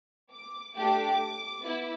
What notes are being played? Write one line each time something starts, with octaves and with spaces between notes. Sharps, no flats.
D6
A3 D4 G4 D6
B3 E4